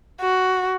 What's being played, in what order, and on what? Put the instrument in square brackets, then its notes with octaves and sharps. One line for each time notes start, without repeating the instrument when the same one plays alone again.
[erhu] F#4